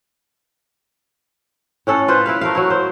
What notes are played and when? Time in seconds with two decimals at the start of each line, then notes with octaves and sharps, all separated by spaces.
1.87 A2 C#4 A4 F#5
2.08 F4 B4 C5
2.26 E4 B4 F5
2.41 A3 A#4 F5
2.55 F#3 E4
2.70 C5